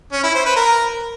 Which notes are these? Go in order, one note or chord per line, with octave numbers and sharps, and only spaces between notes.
C#4
E4
C5
B4
A#4